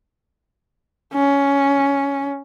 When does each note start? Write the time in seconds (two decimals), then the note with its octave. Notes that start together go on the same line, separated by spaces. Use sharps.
1.14 C#4